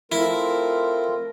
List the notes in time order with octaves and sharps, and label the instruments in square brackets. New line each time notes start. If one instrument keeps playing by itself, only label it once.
[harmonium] A3 C4 F4 [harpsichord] E4 [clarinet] A#4